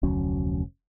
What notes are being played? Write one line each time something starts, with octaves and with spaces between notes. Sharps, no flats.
F1 D2 F#3 C#4